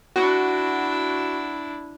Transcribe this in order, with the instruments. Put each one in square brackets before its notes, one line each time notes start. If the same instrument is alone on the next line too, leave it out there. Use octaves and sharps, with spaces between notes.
[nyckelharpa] D4 E4 [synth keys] F#4